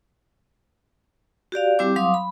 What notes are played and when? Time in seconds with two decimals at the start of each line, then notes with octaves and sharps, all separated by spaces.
1.52 F#4 G4 D5 F5
1.79 G3 C4 E4 G4 D6
1.96 F#3 F5 C6 D6 D#6
2.14 B5